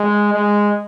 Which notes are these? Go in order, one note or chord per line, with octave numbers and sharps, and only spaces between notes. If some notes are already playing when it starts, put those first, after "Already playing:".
Already playing: G#3
G#3